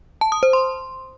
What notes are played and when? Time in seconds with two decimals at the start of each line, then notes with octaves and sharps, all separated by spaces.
0.21 A5
0.32 D#6
0.43 C5
0.53 C6